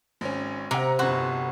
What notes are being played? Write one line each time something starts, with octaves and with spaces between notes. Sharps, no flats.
G#1 C#4
C3 F#5 A#5
G1 F2 F#4 C5